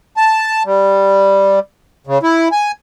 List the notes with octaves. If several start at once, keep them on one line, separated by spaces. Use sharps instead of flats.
A5
G3
C#3
E4
G#5